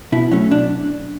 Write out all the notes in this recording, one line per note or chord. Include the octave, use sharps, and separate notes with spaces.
B2 E4
F#3 A3 C#4
B2 D4